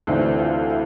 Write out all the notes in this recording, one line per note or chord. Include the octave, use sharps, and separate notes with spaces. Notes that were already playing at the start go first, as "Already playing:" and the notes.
D2 C3 E3 A3 D4 C5
F4
E4